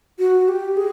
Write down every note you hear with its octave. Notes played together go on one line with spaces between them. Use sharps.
F#4
G4
G#4